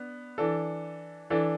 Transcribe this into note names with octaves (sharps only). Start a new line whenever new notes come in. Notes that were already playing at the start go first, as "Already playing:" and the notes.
Already playing: B3 D4
E3 D4 A4
E3 D4 A4